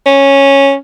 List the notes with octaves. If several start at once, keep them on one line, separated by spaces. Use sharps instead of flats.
C#4